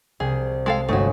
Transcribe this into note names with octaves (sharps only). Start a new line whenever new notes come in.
C2 G#4
G#3 A4 F5
G1 G#3 A3 F#4 C#5